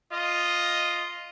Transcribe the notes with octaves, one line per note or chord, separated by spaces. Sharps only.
F4 D#5